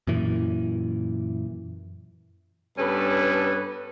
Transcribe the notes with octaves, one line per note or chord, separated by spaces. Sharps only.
F#2 A#2 E3
G2 B3 C#4 A4 B4